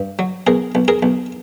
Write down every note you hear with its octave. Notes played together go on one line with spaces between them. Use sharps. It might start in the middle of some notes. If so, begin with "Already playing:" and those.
Already playing: G2
F#3
B1 G#4 A#4
B1
G#4 A#4
B1